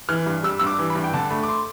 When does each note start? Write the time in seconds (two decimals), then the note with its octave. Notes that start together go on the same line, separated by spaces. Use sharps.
0.09 E3 F6
0.26 G2
0.43 G3 E6
0.60 G2 E6
0.67 D6
0.79 E3
0.90 B5
0.95 G2
1.04 G5
1.14 D3 A5
1.31 A3 B5
1.43 D6
1.48 C6